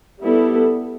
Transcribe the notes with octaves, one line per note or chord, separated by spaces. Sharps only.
G3 B3 E4 A4